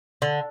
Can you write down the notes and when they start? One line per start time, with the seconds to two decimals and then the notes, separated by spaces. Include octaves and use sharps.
0.22 D3